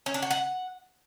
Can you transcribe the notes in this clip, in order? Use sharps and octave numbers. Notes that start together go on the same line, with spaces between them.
C#4
D4
F#4
F#5